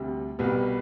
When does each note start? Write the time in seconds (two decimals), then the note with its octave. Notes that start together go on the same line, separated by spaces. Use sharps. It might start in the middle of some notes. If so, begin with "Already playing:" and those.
Already playing: D2 C3 G3
0.39 C2 B2 G3 B3